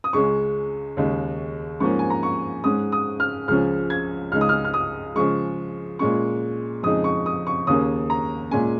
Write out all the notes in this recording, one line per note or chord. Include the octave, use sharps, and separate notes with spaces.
D#6
C#2 C#3 G#3 C#4 C#6
D#2 C#3 G#3 D#4
G#2 F3 A#3 C#4 C#6
G#5
A#5
C#6
G#2 G#3 C#4 D#6
D#6
F6
C#2 C#3 F3 C#4 F6
G#6
C#2 C#3 G#3 D#4 F6
D#6
F6
F6
D#6
C#3 F3 G#3 C#6
A#2 G#3 C#4 C#6
F2 C#3 G#3 D#4 D#6
C#6
D#6
C#6
D#2 C#3 A#3 C#4 D#6
A#5
A#2 G#3 C#4 G#5